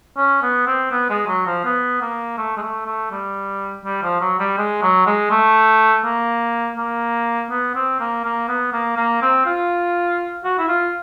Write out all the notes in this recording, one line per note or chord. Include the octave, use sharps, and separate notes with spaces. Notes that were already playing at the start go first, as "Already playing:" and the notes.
C#4
B3
C4
B3
G#3
F#3
F3
B3
A#3
A3
G#3
A3
A3
G3
G3
F3
F#3
G3
G#3
F#3
G#3
A3
A#3
A#3
B3
C4
A#3
A#3
B3
A#3
A#3
C4
F4
F#4
E4
F4